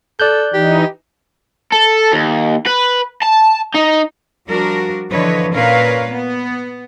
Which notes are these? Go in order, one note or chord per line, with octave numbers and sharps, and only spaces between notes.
A4 D5 F#6 G6
E3 D#4 G4
A4
D#2
B4
A5
D#4
F3 G3 D4 F#4 A#4
D3 E3 F3 B4 C#5 D#5
A#2 C#4 A#4 B4 C#5 F5
B3